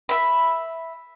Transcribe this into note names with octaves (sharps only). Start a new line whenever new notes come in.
E5 B5